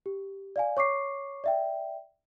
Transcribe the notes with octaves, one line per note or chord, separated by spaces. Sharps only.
G4
D5 F5 G#5
C#5 C#6 D6 C7
D5 E5 G5